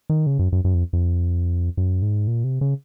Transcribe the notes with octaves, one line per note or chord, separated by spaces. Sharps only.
D#3
C#3
F#2
F#2
F#2
F2
F2
F#2
G#2
A#2
C3
C#3